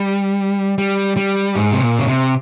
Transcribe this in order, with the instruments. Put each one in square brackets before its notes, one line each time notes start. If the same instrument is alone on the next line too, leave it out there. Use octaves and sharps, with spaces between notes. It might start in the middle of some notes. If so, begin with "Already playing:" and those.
Already playing: [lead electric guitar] G3
G3
G3
G#2
C3
A#2
C#3
C3